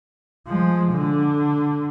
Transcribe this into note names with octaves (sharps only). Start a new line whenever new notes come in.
F3 G#3
D3